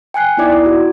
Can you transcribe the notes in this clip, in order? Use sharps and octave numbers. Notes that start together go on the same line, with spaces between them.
G5 G#5 F#6 C7
B3 D#4 E4 D5 D6
F#4